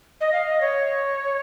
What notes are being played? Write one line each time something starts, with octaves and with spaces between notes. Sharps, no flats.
D#5
F5
D#5
C#5